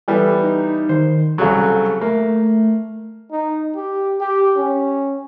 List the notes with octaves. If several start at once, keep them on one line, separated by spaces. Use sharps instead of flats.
E3 G3 B3 A4
D#4
D#3 C5
C2 C#3 F#3 A4
A3 A#3
D#4
G4
G4
C#4